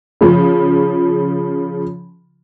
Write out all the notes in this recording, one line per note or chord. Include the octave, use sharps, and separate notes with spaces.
C#3 F3